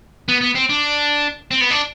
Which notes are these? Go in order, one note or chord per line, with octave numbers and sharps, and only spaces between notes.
B3
B3
C4
D4
C4
B3
D4